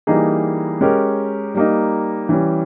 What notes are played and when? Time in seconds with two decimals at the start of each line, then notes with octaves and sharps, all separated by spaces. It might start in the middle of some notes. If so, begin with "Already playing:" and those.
0.07 E3 G3 A#3 D#4 G#4
0.81 G#3 C#4 G4 A#4
1.55 G3 A#3 D#4
2.29 E3 G3 C#4